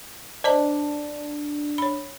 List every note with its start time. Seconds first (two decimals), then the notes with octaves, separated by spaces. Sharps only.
0.44 D4 C5 D#5 A#5
1.78 C#5 B5